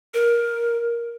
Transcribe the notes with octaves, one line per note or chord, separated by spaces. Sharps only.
A#4